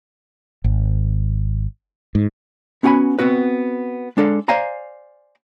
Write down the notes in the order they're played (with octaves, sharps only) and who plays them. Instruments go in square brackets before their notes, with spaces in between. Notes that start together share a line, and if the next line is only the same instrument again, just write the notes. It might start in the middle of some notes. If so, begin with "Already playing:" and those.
[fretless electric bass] G#1
G#2
[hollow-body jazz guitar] B3 C#4 F#4 F#5 G#5 B5
B3 C4 F#4 B4
G#3 D4 A4 F5
C5 D5 F5 G#5 A#5